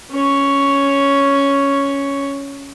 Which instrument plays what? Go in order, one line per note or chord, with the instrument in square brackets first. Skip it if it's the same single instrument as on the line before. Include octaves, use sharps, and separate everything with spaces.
[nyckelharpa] C#4 C#5